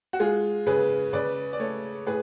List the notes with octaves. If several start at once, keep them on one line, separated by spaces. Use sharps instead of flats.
F#4
G#3 F4 G#4
C#3 G#4 B4
C#3 B4 D5
D5
A3 A4 C#5
A2 G#4 B4